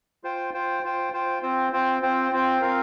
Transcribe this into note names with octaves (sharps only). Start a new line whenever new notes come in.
F4 C5 G5
F4 C5 G5
F4 C5 G5
F4 C5 G5
C4 F4 C5 G5
C4 F4 C5 G5
C4 F4 C5 G5
C4 F4 C5 G5
C4 F4 A#4 F5